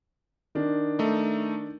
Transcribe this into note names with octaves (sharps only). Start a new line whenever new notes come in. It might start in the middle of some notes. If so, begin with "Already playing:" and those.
D#3 D4
A3 D#4